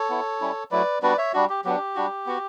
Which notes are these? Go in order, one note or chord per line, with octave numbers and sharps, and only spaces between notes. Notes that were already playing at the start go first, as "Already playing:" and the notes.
Already playing: A4 C#5
B3 E4
G3 C#4 E4
F#3 A3 E4 B4 D5
G3 B3 D4 F#4 B4 D5
C#5 E5
G3 D4 F#4
G4
F#3 B3 D4 G4
G3 D4 F#4
B3 F#4